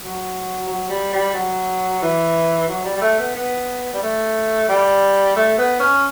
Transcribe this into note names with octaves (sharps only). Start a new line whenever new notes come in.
F#3
F#3
G3
G3
F#3
E3
F#3
G3
G3
A3
B3
B3
G3
A3
G3
A3
B3
C#4